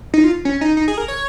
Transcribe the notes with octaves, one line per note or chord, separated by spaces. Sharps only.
D#4
F4
C#4
D#4
D#4
G#4
A#4
C#5